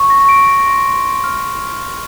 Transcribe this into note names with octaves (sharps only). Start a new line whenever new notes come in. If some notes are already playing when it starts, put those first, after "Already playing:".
Already playing: C#6
A#6
D7
A#6
C6
C6
C6
F6